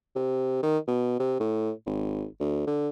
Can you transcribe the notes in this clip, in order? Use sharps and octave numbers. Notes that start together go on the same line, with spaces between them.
C3
D#3
B2
C3
A2
G#1
D2
D3